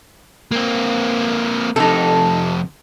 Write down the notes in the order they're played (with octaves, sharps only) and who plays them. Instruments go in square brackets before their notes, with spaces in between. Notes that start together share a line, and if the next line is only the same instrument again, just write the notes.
[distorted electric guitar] A#3 C4
[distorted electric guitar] F2 C3 [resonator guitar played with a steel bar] D#4 A4